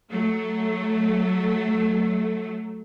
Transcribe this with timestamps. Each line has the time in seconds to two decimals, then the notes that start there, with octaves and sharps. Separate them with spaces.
0.11 F#3 A3